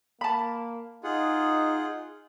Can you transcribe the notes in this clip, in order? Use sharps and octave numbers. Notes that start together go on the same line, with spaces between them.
A#3 A5 B5
D#4 F4 G#4 F#5